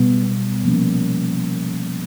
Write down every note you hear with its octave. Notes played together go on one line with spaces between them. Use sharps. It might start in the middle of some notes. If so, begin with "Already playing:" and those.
Already playing: B2 G3 B3
C3 F3 A#3 C#4